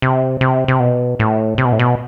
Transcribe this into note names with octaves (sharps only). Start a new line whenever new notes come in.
C3
C3
C3
B2
A2
C3
B2
A2
B2